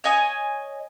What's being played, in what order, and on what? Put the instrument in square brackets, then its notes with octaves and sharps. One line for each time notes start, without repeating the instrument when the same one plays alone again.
[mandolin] C#5 D#5 G#5